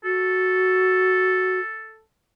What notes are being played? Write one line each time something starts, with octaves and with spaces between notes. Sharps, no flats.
F#4 A4